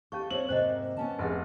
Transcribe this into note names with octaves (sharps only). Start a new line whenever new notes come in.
C#4 G4 A4 F5 C#6
C4 C#5 F#7
G#2 C3 A#3 C5 D#5
B3 C#4 A5
F1 G#4 F#5 G#5